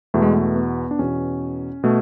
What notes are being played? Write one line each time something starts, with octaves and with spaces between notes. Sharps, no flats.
E2 B2 A3
G#3
A3
B3
D4
E2 B2 C#4
B2 A3